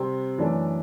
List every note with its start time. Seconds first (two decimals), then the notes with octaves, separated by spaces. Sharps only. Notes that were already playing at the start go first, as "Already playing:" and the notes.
Already playing: C3 G3 C4
0.38 F#2 E3 A3 D4 A4